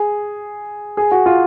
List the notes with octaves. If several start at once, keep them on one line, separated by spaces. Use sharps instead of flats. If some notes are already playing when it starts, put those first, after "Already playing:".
Already playing: G#4
G#4
F#4
F4